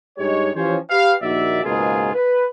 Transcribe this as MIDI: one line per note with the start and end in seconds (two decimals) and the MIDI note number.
0.18 0.50 43
0.18 0.50 56
0.18 0.50 63
0.18 0.50 67
0.18 0.50 73
0.56 0.77 52
0.56 0.77 53
0.56 0.77 61
0.56 0.77 67
0.56 0.77 72
0.56 0.77 73
0.90 1.14 67
0.90 1.14 71
0.90 1.14 77
1.22 1.60 34
1.22 1.60 39
1.22 1.60 63
1.22 1.60 66
1.22 1.60 74
1.22 1.60 76
1.64 2.14 37
1.64 2.14 44
1.64 2.14 47
1.64 2.14 58
1.64 2.14 65
1.64 2.14 68
2.14 2.47 71